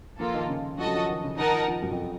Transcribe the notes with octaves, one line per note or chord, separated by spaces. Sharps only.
F3 A#3 F4 A4
D#3
C#3
F3 F#4 A4 D#5 A5
F#3
F3
D#3
C#3
D#3 D#4 A#4 D#5 F#5 A5
F3
F3
F#2
F2